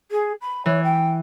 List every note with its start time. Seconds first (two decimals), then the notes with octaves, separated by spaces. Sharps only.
0.11 G#4
0.41 B5
0.66 E3 C#5
0.83 G5